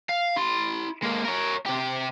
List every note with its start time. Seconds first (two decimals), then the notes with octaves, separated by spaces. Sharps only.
0.09 F5
0.36 E4 C6
1.03 G#3 A#3
1.25 A#4 C#5
1.66 C3 G4